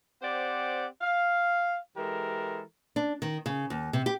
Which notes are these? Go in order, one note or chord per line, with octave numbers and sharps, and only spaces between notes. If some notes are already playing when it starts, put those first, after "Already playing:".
C4 G4 C5 D5 F#5
F5
E3 G#3 G4 A4 A#4
D4
D#3
C#3
D#2
C3
G4